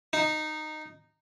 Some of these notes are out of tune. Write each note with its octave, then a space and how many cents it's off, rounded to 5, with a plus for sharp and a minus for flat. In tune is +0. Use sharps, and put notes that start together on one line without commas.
D#4 -10